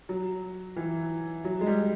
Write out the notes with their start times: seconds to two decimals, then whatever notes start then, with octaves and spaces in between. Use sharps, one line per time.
0.09 F#3
0.76 E3
1.45 F#3
1.61 G#3
1.67 G3